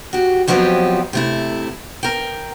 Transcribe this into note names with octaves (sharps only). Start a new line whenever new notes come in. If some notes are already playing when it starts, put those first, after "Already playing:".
F#4 G4
F2 F3 F#3 B3 C4 G4
C3 A3 E4
A#4 G5